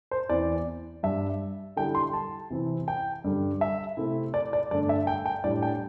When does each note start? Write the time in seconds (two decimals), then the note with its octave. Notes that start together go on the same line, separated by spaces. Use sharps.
0.11 C5
0.29 E2 E3 C4 D5
1.03 G2 G3 D4 E5
1.77 D3 G3 E4 G5
1.95 C6
2.13 A5
2.50 C3 E3 C4 E4
2.88 G5
3.24 G2 D3 G3
3.61 E5
3.97 C3 A3 C4 E4
4.34 D5
4.53 D5
4.71 G2 D3 A3 D4 D5
4.89 E5
5.07 G5
5.26 G5
5.44 A2 G3 D4 D5
5.62 G5